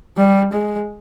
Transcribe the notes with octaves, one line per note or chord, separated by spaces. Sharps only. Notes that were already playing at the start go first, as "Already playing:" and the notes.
G3
G#3